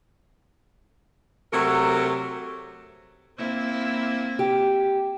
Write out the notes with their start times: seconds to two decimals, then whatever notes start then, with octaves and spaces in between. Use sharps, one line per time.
1.52 C3 F#3 A3 F#4 A4 A#4
3.38 A#3 C4 E4
4.39 G4